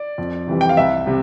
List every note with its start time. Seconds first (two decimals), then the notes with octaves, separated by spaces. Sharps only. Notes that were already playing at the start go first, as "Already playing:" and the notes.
Already playing: D5
0.18 F2
0.47 C3 E3 G3
0.61 G5
0.69 F5
0.77 C2 E5
1.06 C3 G3